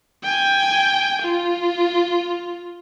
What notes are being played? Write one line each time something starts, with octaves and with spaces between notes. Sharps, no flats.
G5 G#5
F4